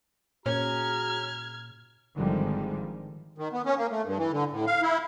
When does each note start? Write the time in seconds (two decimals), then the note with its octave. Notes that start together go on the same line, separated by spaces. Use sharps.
0.46 A#2 C#4 F#4 G#4 A#5 F6 G#6
2.15 G#1 D3 D#3 F3 G3 G#3
3.38 D#3
3.53 B3
3.66 C#4
3.78 A#3
3.91 A3
4.05 G2
4.18 E3
4.32 D3
4.52 A2
4.67 F5
4.82 E4